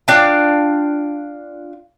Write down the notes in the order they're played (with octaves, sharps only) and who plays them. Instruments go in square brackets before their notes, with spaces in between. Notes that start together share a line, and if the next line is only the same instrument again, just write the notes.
[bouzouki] D4 F4 F5 G5